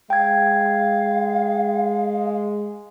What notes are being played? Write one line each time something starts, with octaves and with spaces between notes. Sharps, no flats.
G#3 F5 G5 G#6